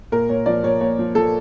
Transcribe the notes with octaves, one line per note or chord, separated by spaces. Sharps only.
A#2 A#4
A#2 C#5
F3 D5
A#2 C#5
A#2 C#5
F3
F3 A4